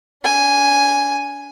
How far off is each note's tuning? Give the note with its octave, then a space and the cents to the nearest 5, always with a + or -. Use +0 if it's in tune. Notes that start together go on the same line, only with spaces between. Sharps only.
D4 -40 G#5 +0